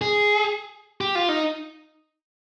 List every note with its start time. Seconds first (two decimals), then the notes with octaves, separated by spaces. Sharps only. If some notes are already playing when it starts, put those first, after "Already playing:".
0.01 G#4
1.01 G4
1.15 F4
1.29 D#4